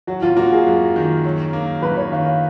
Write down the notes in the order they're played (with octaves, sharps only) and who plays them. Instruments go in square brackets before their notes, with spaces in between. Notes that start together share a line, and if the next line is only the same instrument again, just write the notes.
[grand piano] F#3 [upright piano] F#4
[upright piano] F4
[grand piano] A#3 [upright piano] F#4
[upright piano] G#4
[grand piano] F#2
D#3
F#3
A#3
[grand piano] F#2 [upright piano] B4
[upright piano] C#5
[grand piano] D#3 [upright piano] F5
[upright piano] F5